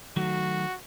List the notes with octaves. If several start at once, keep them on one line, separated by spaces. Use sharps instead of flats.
D#3 F#3 A3 F#4